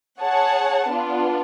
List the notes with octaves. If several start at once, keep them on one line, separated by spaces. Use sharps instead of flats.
G#4 C#5 F#5 A5
B3 D4 F4